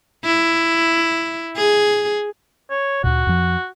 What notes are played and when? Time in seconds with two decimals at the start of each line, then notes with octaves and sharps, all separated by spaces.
0.24 E4
1.56 G#4
2.71 C#5
3.04 D2 A#2 F#4
3.27 F2 F3